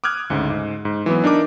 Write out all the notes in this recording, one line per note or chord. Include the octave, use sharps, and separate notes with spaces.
D6 D#6 F6 F#6 G#6
D2 G#2 C#3
G#2
G#2
E3 F#3 B3
D4 D#4 A#4 D6